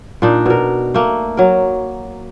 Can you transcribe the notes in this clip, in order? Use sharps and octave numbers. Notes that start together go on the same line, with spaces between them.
A#2 D4 D#4
B2 A#4
A3 A#3
F#3 A#4